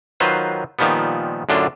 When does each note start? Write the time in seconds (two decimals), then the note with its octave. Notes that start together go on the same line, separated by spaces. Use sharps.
0.20 D#3 F#3 F4 B4 C5
0.79 A#2 D#3 F3 G3 B3
1.49 F#2 A2 D3 D4 F4